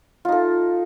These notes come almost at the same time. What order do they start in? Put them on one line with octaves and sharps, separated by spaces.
F4 D#4 A4